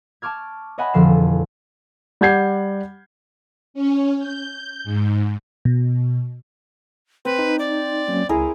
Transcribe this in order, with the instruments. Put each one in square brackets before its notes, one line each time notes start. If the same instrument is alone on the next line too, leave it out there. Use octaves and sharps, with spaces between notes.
[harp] A5 C#6 D6 F6 G#6
C#5 D#5 F#5 G#5 A5 B5
E1 F2 D3 F3 C7 E7
[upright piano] G3 F#5 G6 G#6 C7
[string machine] C#4
G6
G#2
[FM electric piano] B2
[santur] C4 [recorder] B4
[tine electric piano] D#4
[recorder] D5
[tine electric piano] F#3 A#3 C#4
[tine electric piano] C#2 [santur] E4 G#4 A#4